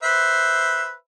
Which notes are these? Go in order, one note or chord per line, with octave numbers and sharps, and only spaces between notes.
B4 C5 E5